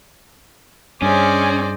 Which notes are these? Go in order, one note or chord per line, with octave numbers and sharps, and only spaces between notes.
G2 C#4 G#4 C5 D5 D#5